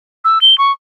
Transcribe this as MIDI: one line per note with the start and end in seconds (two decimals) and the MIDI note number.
0.24 0.41 88
0.41 0.57 103
0.58 0.72 85